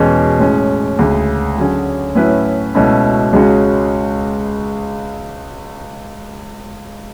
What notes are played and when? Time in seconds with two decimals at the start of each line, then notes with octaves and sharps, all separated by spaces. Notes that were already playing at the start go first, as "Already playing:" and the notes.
Already playing: E2 B2 G#3 C#4
0.39 A2 G#3 C#4
0.99 D2 C#3 G#3
1.57 D3 F#3 C#4 G#4
2.15 A2 F#3 C#4 E4 B4
2.75 C#2 B2 A3 C#4 E4
3.33 C#2 C#3 G#3 C#4 F#4